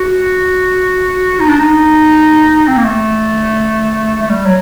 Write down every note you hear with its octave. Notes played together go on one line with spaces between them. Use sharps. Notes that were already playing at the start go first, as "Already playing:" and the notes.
Already playing: F#4
D#4
D4
D#4
C4
A#3
A3
A3
G3
F#3